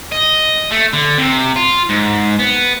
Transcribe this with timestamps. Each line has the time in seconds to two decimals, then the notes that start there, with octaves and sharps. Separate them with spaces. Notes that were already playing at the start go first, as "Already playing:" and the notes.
0.12 D#5
0.71 A3
0.93 D3
1.18 C3
1.56 F4
1.90 G#2
2.39 B3